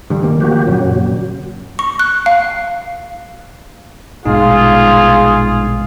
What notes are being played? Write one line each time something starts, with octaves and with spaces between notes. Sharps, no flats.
G2 D3 G3
D2 D#3 A#3
F3 F#4 G4
G4
F#2 A#2 C#3 F#3
C#6
F#6
F5
A#1 G2 B2 G#3 D#4 F4 G#4